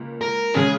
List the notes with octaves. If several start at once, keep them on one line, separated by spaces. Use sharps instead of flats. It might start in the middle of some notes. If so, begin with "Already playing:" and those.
Already playing: C#2 A#3
A#4
C#3 G#3 C#4 G#4